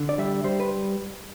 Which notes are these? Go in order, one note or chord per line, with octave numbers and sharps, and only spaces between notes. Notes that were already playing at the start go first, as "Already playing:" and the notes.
Already playing: D3
D5
G3 E5
G3 C5
B4